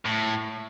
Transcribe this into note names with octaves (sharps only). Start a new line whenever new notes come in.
A2